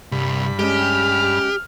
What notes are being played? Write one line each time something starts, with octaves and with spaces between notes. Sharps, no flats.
C2 G2 B5
G#3 C#4 G4 F6